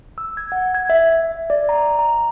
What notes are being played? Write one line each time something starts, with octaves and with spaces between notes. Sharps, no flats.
E6
G#6
F#5
G#6
E5
D5
A#5
A#5